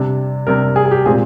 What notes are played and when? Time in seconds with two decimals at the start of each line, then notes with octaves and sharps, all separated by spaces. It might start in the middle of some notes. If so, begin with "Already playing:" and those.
Already playing: C3 G3 D4
0.47 C3 G3 D4 A#4
0.76 G#4
0.86 G#4
0.91 G4
1.06 A#2 G#3 C4 G#4